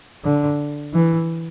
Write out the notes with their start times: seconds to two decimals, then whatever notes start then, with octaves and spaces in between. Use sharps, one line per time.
0.24 D3
0.94 E3